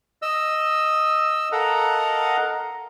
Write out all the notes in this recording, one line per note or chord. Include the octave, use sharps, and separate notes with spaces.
D#5 E6
A4 A#4 D#5 F5 F#5 A#5